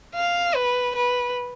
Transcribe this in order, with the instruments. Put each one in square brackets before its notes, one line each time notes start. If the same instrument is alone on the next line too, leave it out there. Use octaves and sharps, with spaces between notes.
[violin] F5
B4
B4